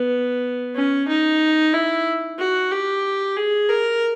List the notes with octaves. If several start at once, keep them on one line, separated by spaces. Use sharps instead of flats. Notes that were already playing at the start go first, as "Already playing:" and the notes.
Already playing: B3
C#4
D#4
E4
F#4
G4
G#4
A#4